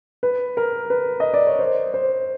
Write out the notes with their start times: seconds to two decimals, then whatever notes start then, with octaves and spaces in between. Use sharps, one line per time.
0.23 B4
0.57 A#4
0.90 B4
1.20 D#5
1.34 D5
1.47 C#5
1.59 C5
1.94 C5